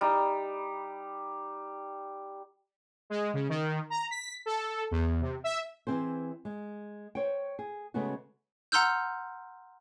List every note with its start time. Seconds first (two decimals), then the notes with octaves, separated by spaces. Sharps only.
0.01 G3 D#4
3.10 G#3
3.34 C#3
3.49 D#3
3.90 A#5
4.11 B6
4.46 A4
4.91 E2
5.21 C3
5.44 E5
5.87 E3 C4 G#4 C5
6.45 G#3
7.15 C5 C#5 G5
7.59 G#4
7.94 C#3 G#3 A3 B3 C#4 F#4
8.72 F#5 A#5 C6 E6 F6 G6